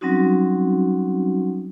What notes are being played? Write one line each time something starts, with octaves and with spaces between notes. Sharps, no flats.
F#3 G3 C4 C#4 D#4 F#4